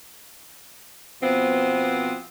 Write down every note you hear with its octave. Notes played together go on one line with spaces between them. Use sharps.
B2 F3 B3 C4